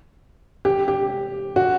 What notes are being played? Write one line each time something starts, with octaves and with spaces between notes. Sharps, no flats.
G4
G4
F#4